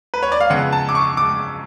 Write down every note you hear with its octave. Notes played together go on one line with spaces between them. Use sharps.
B4
C#5
D5
F5
F2 C#3 G#3 B3 F#5
A5
D6
C#6
D6